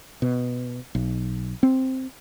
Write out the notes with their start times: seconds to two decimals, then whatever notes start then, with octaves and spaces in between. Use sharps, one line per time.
0.22 B2
0.95 B1
1.63 C4